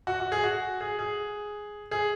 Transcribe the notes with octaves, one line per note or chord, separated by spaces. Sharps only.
F#4
F#4
G#4
F#4
G#4
G#4
G#4